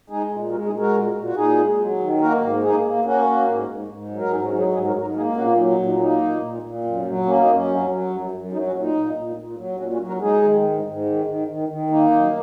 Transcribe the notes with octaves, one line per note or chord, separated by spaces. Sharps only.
G#3 D#4 G#4
A#2
G#3 F#4 A#4
D#4 G#4
G#3
F#4 A#4
A#2
A#2
F#4
A#2 D#4 G#4
G#3
F#3
D#3
A#3 F#4 A#4
G#2
A#3 D#4 G#4
A#3
A#3 C#4 F#4
A#3
G#2
G#2
G#2
F#3
A#4
G#2 D#4 G#4
C#4 F#4
F#3
D#4 G#4
G#2 D#4 G#4
F#4 A#4
G#2
F#4 A#4
A#3 D#4 G#4
A#2 C#4 F#4
F#3 D#4
D#4
A#2
D#4
A#3 D#4
A#2
A#2
A#2
F#2
F#3
A#3 C#4
D#4
F#2 C#4
F#3
F#3
F#2
F#2
F#3 D#4
C#4 F#4
A#2
D#4
A#2
A#2
A#2
F#3
A#2 C#4 F#4
C#4 F#4
F#3
F#4 A#4
G#3 D#4 G#4
D#3
G#2
G#2
D#3
D#3
D#3
D#3
A#3 D#4
F#2